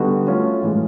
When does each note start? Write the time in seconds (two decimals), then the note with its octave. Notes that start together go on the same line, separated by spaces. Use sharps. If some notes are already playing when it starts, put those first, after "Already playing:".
Already playing: D3 G3 B3 D#4 F#4
0.26 F#3 A3 C#4 F4
0.62 A2 E3 G#3